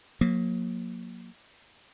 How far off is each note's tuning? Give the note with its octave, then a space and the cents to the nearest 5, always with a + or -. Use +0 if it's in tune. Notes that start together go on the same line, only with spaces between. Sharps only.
F#3 -40 A#3 +0